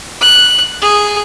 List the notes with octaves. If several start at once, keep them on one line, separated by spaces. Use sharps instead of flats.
F#6
G#4